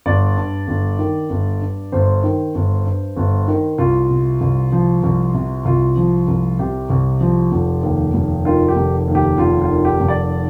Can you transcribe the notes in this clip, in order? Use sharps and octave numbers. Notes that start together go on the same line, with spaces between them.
G1 D5
G2
G1
D#3
G1
G2
G1 C5
D#3
G1
G2
G1
D#3
C2 F4
C3
C2
F3
C2
C3
C2 F4
F3
C2
C3 G4
C2
F3
F1
D#2
F1
D#3 F4
G4
F1
D#2
G4
F1 F4
F4
D#3
G4
F1
D5